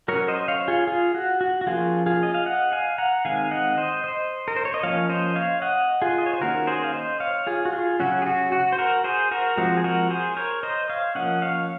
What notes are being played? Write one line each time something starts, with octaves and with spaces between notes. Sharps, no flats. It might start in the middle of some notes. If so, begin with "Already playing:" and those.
F#3 C#4 A#4 C#5
C5 D#5
C#5 F5
F4 G#4
F4 G#4
F#4
F#4
F#4
F3 A#3 C#4 F4 G#4
F4 G#4
D#5
F5
D#5 F#5
F5 G#5
F#5 A#5
D#3 G#3 C4 F5 G#5
D#5 F#5
C5 D#5
C5 D#5
A#4
C5
C#5
D#5
F3 A#3 C#4 C#5 F5
C5 D#5
C#5 F5
D#5 F#5
F4 G#4
D#5
C#5
C5
D#3 A#3 C#4 F#4 A#4
G#4 C5
F5
C5 D#5
C#5 F5
F4 G#4
F#4
F4 G#4
C#3 F#3 C#4 F#4
G#4
F#4
F#4
C5
F#4 A#4
G#4 C5
F#4 A#4
F3 G#3 C4 F#4
G#4
F#4 A#4
G#4 C5
A#4 C#5
C5 D#5
C#5 F5
F3 A#3 C#4 D#5 F#5
C#5 F5